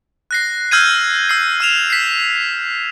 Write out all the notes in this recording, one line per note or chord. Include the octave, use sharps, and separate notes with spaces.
F#6 A#6 C7
E6 F6 G6 G#6 C7 D#7
E6 C7
F6 E7 F7
B6 C7